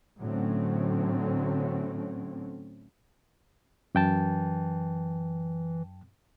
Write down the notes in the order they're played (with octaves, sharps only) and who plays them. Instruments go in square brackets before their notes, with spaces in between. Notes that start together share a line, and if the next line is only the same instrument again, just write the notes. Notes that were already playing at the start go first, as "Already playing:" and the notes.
[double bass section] A2 D3 F#3 A3 C4 C#4
[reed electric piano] F#2 G5 A5 [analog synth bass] E3